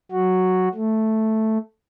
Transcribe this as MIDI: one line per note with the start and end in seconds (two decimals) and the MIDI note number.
0.12 0.68 54
0.12 0.68 66
0.75 1.58 57